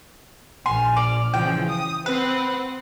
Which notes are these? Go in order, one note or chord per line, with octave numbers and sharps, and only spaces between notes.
A#1 G#5 C6 F6
D5
C#3 E3 F3 G5
D#6
C4 B4 F#5